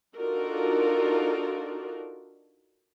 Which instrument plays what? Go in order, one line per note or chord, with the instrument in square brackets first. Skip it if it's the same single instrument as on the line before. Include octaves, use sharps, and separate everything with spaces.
[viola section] D4 D#4 F4 F#4 A4 A#4